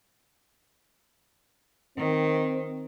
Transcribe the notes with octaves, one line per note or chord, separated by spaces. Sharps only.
D#3 C4